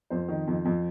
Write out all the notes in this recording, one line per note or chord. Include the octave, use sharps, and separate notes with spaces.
F2 C5
D#3
F2
F2